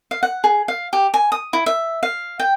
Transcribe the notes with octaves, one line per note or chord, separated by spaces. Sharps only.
F5
F#5
G#4
F5
G4
G#5
D#6
E4
E5
F5
G5